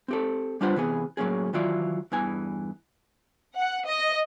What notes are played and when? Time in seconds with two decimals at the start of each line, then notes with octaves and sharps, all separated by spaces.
0.08 C4 G4 A4
0.61 G3 D4 F4 B4 C5 F#5
0.76 C3 E3 B3 G#4
1.17 A2 F#3 A#3 C#4 G#4
1.53 D#3 E3 F#3 E4 F4 D5
2.12 E2 G2 E3 G#5
3.53 F#5
3.85 D#5